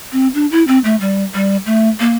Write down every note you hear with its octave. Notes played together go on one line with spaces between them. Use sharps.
C4
D4
E4
C4
A3
G3
G3
A3
A#3